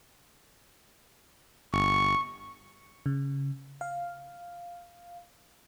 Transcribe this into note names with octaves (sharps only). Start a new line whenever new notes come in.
G1 C#6
C#3
F5